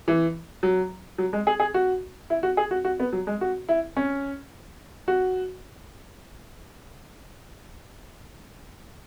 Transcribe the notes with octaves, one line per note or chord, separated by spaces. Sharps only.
E3
F#3
F#3
G#3
G#4
G#4
F#4
E4
F#4
G#4
F#4
F#4
B3
F#3
G#3
F#4
E4
C#4
F#4